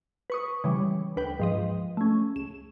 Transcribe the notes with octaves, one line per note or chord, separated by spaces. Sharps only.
B4 C#6 D#6
C#3 E3 G3
D2 B4 G5
G#2 F3 D#5
A3 C#4
C#2 E7